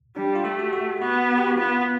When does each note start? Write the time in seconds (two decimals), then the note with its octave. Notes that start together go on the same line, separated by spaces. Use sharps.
0.16 G3 D4
0.35 F4
0.45 A3 G4
0.59 F#4
0.73 F#4
1.01 B3 F#4
1.37 G4
1.47 F#4
1.58 B3 F4